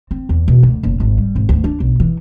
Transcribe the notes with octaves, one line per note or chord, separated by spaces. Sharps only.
C4
E2
B2
D2
F#1
G#1
G3
G#1
D2
D4
B1
E3